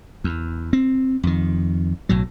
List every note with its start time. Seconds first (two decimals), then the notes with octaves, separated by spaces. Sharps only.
0.24 E2
0.73 C4
1.23 F2 D#3
2.09 B1 A2 F#3